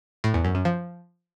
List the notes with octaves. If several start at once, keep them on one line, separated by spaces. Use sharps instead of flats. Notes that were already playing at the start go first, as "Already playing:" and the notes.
A2
E2
F#2
F#2
F3